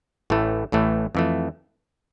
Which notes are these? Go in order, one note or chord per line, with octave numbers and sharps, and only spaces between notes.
A1 A2 E3 A3
A1 A2 E3 A3
F2 E3 A3